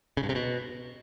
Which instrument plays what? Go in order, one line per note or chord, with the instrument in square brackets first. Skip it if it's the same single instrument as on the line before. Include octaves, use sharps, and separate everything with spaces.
[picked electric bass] C#3
G2
C3
B2